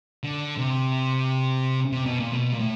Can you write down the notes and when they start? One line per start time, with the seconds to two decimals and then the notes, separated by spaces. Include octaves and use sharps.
0.24 D3
0.58 C3
1.92 C3
2.06 B2
2.20 A#2
2.33 B2
2.53 A#2
2.60 A2